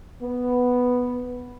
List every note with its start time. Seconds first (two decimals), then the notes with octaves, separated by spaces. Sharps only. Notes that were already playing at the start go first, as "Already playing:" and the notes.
0.23 B3